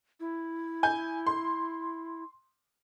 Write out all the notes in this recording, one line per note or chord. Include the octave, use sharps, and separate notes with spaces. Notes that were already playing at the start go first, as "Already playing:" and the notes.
E4
G#5 G6
C6